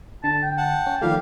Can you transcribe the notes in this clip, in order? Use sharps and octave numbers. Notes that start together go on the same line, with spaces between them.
D3 A5
G5
F#5 A5
C#4
D#3 F3 G3 A3 G4 F5